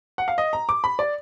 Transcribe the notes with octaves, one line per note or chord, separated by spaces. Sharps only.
F#5
F5
D#5
A#5
D6
B5
D5